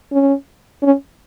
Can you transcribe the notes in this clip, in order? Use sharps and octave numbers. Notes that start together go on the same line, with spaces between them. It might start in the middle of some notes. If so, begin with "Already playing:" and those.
C#4
C#4